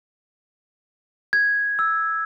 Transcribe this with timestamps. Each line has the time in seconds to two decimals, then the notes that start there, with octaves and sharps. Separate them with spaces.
1.33 G#6
1.79 E6